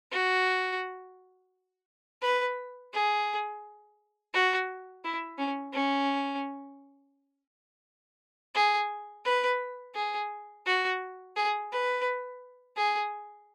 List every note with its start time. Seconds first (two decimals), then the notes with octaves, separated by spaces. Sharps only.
0.12 F#4
2.22 B4
2.93 G#4
4.34 F#4
5.04 E4
5.38 C#4
5.74 C#4
8.55 G#4
9.25 B4
9.96 G#4
10.66 F#4
11.36 G#4
11.72 B4
12.77 G#4